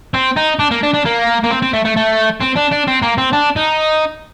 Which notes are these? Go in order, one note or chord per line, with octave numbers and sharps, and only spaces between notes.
C4
D#4
D4
A#3
D4
D4
A#3
A#3
C4
C4
A3
A3
A3
C4
D4
D4
C4
A#3
C4
D4
D#4